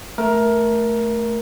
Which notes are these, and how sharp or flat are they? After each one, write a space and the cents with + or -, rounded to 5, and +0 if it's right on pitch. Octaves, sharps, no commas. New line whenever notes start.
A3 +0 A#4 +15